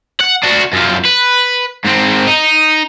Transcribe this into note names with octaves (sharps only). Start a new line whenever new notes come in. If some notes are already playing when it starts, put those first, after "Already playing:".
F#5
D4 F#4
F#2 F3
B4
G#2 C4
D#4